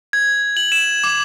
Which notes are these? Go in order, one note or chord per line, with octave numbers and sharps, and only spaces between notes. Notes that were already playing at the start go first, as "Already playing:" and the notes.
G#6
F#7
E7
D6